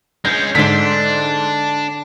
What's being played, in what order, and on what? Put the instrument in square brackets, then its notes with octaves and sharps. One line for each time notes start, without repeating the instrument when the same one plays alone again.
[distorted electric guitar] G#3 C#4 [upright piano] G6
[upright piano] G#2 B6 [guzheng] D3 C6 [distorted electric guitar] D4